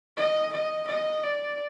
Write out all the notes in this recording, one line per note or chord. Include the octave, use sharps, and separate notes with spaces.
D#5
D#5
D#5
D5